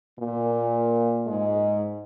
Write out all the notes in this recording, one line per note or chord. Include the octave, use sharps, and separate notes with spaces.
A#2 A#3
G#2 G#3